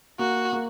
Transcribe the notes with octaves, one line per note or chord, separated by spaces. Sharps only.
A#3 F#4
A#3